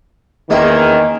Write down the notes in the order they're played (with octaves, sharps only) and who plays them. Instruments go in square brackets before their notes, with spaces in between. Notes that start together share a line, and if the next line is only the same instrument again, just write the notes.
[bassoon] E2 [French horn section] D#3 [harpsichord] G#3 D#4 E5 [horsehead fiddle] A#3 C#4